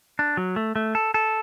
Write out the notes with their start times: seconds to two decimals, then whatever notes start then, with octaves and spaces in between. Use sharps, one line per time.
0.19 D4
0.37 F#3
0.56 A3
0.76 A3
0.95 A4
1.14 A4